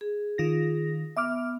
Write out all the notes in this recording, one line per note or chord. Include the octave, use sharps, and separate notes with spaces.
G#4
D#3 F4 A#6
B3 E5 D6 F6